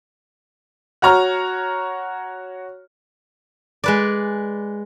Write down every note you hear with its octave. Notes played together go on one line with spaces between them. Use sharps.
F#4 C#5 A#5 F6
G#3 B4 D5